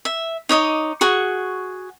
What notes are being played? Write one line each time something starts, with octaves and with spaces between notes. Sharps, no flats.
E5
D#4 C#5 D#5 D6
F#4 G#4 C#6